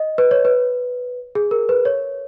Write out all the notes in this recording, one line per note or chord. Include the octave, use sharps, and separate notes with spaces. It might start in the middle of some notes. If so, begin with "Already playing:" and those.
Already playing: D#5
B4
C#5
B4
G#4
A#4
B4
C#5